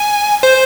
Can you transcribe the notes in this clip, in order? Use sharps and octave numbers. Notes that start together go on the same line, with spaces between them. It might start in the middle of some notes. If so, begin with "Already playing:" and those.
Already playing: G#5
C5